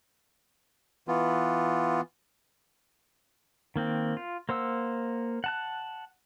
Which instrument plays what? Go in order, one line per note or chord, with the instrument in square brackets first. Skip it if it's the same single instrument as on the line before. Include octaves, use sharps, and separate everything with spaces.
[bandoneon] E3 B3 F4
[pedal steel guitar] D#3 A#3 C4
F4
A#3 C5 F#5 E6
F#5 A5 F#6